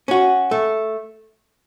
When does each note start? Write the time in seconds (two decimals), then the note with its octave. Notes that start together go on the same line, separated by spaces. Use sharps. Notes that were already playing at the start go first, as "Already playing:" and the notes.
0.08 C#4 F#4
0.51 A3